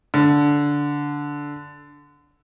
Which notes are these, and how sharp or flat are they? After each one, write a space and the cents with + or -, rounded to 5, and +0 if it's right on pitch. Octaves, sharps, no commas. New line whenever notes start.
D3 -10